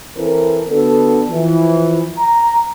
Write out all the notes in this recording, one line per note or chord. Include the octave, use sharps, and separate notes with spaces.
E3 C4 A4 A#4
D3 B3 D4 F#4 A4
E3 F3
A#5